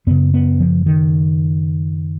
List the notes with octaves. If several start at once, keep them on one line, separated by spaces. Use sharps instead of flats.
F#2 C#3 B3
B3
F3
D#3